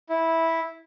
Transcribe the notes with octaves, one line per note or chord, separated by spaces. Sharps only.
E4